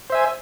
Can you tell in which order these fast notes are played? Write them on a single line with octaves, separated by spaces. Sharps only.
C5 E5 G#5